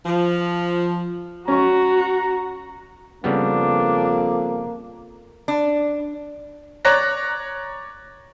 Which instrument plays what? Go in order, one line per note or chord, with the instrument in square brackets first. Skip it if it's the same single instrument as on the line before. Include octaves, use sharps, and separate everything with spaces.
[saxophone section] F3
[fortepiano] C#4 C#6 [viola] F#4 [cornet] A#5
[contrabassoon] F2 [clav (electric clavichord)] C#3 G3 B3 [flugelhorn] A#3 [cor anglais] D4
[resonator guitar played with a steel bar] D4
[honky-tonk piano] C#5 D5 A#5 F#6 A#6